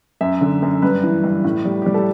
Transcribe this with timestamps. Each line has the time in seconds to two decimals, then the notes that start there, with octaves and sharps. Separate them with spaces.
0.21 F#2 E5
0.41 D3
0.62 F#2
0.82 G2 B4
1.03 E3
1.24 G2
1.44 A2
1.65 G3
1.82 G3 G4
1.94 A4